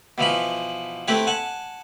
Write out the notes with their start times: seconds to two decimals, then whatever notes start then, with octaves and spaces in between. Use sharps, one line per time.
0.18 B2 E3 F3 B5
1.08 A3 C4 E4 G4 B4
1.27 F#5 G#5 A5